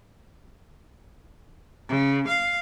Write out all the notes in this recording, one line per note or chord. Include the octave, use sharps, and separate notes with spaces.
C#3
F5